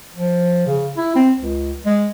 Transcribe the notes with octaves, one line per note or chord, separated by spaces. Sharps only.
F3
C#3
E4
C4
C#2
G#3